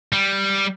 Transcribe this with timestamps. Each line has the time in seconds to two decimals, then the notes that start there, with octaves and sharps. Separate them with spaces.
0.13 G3